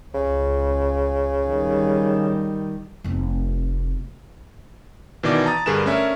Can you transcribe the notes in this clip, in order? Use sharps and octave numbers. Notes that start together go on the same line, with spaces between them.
C#2 C#3
D#3 G3
F1 C4
B2 D#3 E3 D5 D6
A5 A#5 D#6 A6
G2 D3 G#4 A#4 B4 E7
A3 C#4 D4 A#4 E5